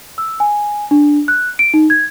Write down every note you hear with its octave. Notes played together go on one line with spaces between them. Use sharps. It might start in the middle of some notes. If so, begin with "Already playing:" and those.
E6
G#5
D4
F#6
D7
D#4
G#6